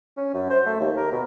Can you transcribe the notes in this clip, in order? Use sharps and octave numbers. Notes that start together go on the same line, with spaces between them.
C#4
F#2
C5
A3
D#2
A#4
B2